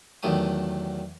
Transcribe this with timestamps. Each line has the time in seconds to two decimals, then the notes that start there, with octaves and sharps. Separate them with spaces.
0.23 E2 D#3 F#3 A3 G4 D#6